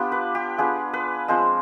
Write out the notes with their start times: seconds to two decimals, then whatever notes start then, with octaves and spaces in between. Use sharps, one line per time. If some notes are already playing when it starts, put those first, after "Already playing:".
Already playing: B3 D4 F4 G4
0.12 B4
0.35 G4
0.58 B3 D4 F4 G#4
0.93 B4
1.28 F3 G#3 C4 C5